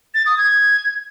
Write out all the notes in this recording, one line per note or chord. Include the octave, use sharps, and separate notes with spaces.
A6
D#6
G#6